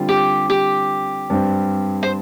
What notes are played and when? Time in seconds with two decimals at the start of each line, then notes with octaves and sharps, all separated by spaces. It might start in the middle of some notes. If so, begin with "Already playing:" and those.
Already playing: D3 G3 C4 F4
0.09 G4
0.50 G4
1.30 G2 G3 C4
2.03 C5